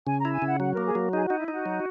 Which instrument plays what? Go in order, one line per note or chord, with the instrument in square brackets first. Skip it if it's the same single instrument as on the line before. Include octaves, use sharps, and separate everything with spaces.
[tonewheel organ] C#3 [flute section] G#5
[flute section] A#5
[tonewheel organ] E4
[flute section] G#5
[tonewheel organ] C#3
[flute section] F#5
[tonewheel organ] F#3 [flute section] F#5
[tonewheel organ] A#3 [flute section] A#4
[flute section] G#4
[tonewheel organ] F#3
[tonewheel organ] D#4 [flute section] G#4
[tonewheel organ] D#4 [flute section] F#4
[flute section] E4
[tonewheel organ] D#4 [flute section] F#4
[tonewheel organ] F#3